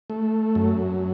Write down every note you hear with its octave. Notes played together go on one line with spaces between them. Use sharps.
A3
F#2